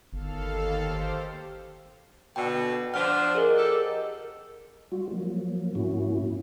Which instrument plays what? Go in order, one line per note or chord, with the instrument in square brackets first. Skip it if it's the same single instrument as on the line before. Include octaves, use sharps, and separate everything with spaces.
[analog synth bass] G1 [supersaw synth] D#2 A4 F5
[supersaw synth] G4 C5
[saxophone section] B2 D3 [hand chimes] G5
[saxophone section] F3 D4 [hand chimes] F#5 F6
[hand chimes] G#4 A#4 D#5
[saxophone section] G4 A4
[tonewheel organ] G3 F4 F#4
F3 F#3 A#3
G#2 A#3 C#4 E4 F#4